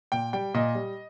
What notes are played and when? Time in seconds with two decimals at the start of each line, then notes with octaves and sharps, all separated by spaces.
0.12 A#2 G5
0.33 G3 G5
0.54 A#2 D#5
0.75 G3